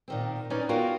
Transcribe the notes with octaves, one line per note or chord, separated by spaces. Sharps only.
A#2 D#3 C4
C#4 D#4 B4 C#5 D5
B3 F4 F#4 A#4 F5 G5